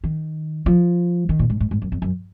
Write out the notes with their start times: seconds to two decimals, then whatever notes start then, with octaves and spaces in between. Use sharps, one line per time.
0.04 D#3
0.66 F3
1.29 D#3
1.39 A#2
1.50 G#2
1.60 G#2
1.71 G#2
1.82 F#2
1.92 F2
2.02 F#2